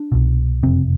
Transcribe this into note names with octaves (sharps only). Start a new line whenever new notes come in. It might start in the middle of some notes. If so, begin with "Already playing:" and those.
Already playing: D4
C2 B2
F#1 F2 C3 C4